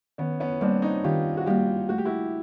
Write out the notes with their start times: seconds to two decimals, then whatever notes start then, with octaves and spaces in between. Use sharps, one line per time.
0.18 D#3 B3 C#4
0.40 B3 C#4
0.61 G3 A#3 C4 D4
0.82 C#4 D#4
1.04 D#3 F4 G4
1.37 F#4
1.46 G3 A#3 F4 G4
1.89 A3 F#4
1.98 G4
2.05 E4 F#4